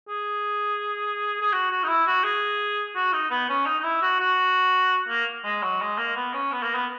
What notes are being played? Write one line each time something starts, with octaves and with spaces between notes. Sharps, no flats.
G#4
G#4
F#4
F#4
D#4
E4
F#4
G#4
F#4
D#4
B3
C#4
D#4
D#4
E4
F#4
F#4
A#3
G#3
F#3
G#3
A#3
B3
C#4
B3
A#3
B3